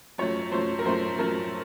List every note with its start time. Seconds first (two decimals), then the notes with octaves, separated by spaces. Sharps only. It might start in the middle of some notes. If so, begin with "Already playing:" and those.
0.18 F#2 F3 A3 C#5
0.52 F#2 F3 A3 C5
0.79 A#4
0.85 F#2 F3 A3 C5
1.18 F#2 F3 A3 A#4